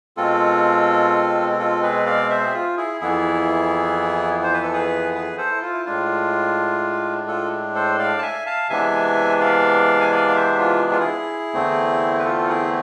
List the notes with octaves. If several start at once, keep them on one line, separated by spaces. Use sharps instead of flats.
B2 G#3 C4 F4 A4
F4 A4
G#4 B4
D5 F5
C5 E5
G#4
F4
E4 G#4
F2 E3 B3 E4 G#4
C5
B4
A4
G#4 B4
G#4 B4
A4 C5
E4
F4
E4
A2 G#3 D4 F4
F4 A4
A4 C5
D5 F5
A5
E5 G#5
F5 A5
C3 E3 G#3 B3 D4 E5 G#5
D5 F5
G#5
D5 F5
F5
C5 E5
F4
G#4
F4
E4 G#4
E2 D3 A3 C4
B4
F4 A4
F4
E4 G#4